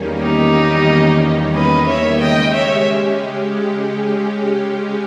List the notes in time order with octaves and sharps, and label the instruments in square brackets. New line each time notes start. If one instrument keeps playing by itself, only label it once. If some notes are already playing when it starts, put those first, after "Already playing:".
Already playing: [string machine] E2 D#3 G3 A#3 C#4
[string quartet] D#4 G4
B4 D#5
C#5 E5
[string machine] C#3 G#3 C#4 G4 [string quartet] D#5 G5
[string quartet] C#5 E5